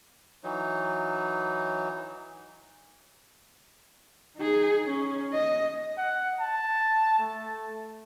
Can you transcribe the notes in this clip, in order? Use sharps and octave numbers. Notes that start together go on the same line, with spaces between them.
E3 F#3 D#4
D#4 G#4
C#4
D#5
F#5
A5
A3